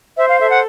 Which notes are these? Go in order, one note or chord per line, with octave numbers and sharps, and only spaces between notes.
C5 E5
F5
A4 E5
F#5